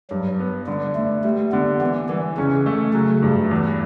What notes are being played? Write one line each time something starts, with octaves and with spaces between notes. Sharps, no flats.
G2 F#3
B3
D3 G3
D3 A3
G3 A3
D3 B3
E3 B3
E3 G3
C#3 C#4
A3
C#3 F#3
G2
E2